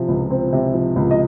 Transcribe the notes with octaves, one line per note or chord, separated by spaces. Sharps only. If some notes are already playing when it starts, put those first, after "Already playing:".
Already playing: C3 F3
C#2
C4
C3
F3
C#2
D#5